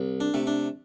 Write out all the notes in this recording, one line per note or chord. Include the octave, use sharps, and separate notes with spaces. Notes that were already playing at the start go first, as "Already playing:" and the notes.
Already playing: C2
D4
C3 A3
D4